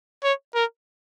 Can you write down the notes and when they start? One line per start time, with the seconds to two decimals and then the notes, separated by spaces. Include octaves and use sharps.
0.24 C#5
0.55 A#4